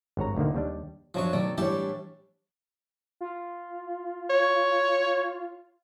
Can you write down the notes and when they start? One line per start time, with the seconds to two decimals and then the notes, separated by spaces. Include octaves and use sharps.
0.17 G#1 G2 C#5 A#5
0.36 D2 A#2 D3 D#3 A#3
0.55 D#2 G3 D4
1.14 F#2 F3 F#3 D4 C#5
1.33 B2 D#3 F#3 A3 D5
1.58 A1 G3 D4 E4 G4 C#5 A5
3.21 F4
4.30 C#5